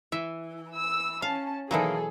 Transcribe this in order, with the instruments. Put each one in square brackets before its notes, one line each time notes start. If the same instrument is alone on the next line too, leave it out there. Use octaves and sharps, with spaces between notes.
[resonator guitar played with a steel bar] E3 [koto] E5
[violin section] E6
[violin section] C#4 A5 [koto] F5
[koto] B2 E3 F#3 [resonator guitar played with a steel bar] D#3 A#3 [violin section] G#4 A4